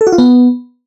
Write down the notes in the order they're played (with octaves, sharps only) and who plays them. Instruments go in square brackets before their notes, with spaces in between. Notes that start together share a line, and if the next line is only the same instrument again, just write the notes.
[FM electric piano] A4
F#4
F4
B3